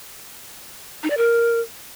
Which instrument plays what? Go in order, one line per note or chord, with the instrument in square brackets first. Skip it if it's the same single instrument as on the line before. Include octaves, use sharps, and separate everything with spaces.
[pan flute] D#4
D5
A#4